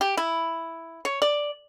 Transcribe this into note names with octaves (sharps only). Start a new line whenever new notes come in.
G4
E4
C#5
D5